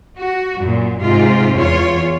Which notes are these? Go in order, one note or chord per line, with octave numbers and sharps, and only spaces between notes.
F#4
F#2 A#2
G#2 C3 F4
E2 F4 C#5